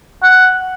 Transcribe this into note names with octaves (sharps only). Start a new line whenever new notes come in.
F#5